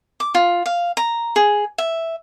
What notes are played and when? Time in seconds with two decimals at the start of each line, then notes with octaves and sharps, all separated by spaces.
0.20 D6
0.35 F4
0.66 F5
0.97 A#5
1.36 G#4
1.78 E5